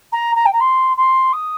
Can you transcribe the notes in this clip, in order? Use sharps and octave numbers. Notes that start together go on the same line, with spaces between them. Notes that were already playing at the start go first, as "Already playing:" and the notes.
A#5
A#5
G5
A#5
C6
C6
D#6